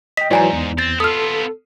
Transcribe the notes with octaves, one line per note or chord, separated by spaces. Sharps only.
D#5 G5 B6
G#2 E3 F#3 D5 G#5 A#5
E2
C4 A6
B3 F4 A4 D#6 F6